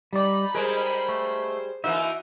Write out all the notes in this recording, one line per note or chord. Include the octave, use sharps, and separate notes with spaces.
G3 D#4 D5 B5
G3 G#3 G#4 A#4 C5
A3
E3 A#3 D#4 F#4 E5